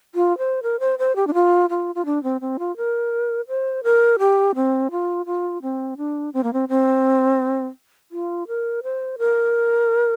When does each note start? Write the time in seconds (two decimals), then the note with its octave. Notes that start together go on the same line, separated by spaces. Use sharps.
0.15 F4
0.38 C5
0.63 A#4
0.80 C5
0.99 C5
1.16 G4
1.27 D4
1.34 F4
1.70 F4
1.95 F4
2.05 D4
2.23 C4
2.41 C4
2.59 F4
2.77 A#4
3.48 C5
3.84 A#4
4.19 G4
4.55 C4
4.91 F4
5.26 F4
5.62 C4
5.97 D4
6.34 C4
6.43 A#3
6.53 C4
6.69 C4
8.11 F4
8.48 A#4
8.83 C5
9.18 A#4